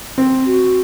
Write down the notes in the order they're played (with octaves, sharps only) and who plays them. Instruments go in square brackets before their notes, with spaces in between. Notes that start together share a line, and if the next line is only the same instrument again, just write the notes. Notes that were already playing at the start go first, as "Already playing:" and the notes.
[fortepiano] C4
[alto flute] F#4